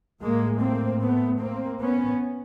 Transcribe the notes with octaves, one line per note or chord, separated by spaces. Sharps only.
A2 G#3 A#3
A#3 C4
A3 B3
A#3 C4
B3 C#4